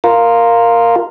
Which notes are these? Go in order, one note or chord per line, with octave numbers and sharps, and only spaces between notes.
F4 A#4